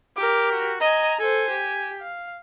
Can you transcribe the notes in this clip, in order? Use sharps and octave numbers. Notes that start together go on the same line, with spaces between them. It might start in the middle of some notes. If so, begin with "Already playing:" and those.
G4 A#4 D6
F#4
D#5 G#5 A#5
A4 C5 G#5
G4
F5